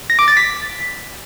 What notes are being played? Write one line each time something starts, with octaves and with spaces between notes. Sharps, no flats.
A#6
D6
A6
B6